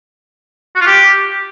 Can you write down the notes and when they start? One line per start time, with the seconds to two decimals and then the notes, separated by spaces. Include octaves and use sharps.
0.75 F#4
0.81 F4
0.86 G4